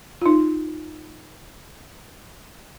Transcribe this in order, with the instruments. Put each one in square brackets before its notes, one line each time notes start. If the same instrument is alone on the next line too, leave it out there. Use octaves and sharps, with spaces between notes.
[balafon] D#4 F4